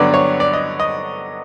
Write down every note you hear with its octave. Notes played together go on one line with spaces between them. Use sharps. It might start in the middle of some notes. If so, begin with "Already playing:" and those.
Already playing: G2 D3 F#3 B3 D4 D5
C#5
D5
D#5
D#5